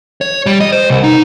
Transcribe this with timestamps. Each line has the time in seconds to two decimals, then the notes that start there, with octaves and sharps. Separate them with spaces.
0.21 C#5
0.46 G3
0.60 D#5
0.72 C5
0.90 C2
1.04 D#4